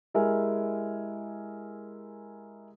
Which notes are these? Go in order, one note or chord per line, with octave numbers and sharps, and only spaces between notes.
G#3 E4 G4 G#4 A#4 G#5